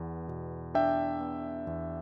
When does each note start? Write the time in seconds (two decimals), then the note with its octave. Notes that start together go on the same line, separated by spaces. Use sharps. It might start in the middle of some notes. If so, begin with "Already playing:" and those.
Already playing: E2 B3
0.28 B2
0.74 D4 E5 G5
1.20 B3
1.67 E2